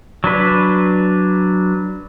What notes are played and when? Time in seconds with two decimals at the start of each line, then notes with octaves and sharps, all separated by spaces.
0.24 F#3 D4 B4